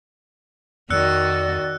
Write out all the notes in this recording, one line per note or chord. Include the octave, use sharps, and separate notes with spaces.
F2 D#3 F#4 D5 E6 F#6 C#7